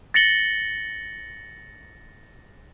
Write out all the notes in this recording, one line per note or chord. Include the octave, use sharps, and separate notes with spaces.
A6 A#6 C#7 F#7 G7